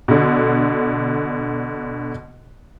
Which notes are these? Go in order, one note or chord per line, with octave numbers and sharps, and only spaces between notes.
B2 D3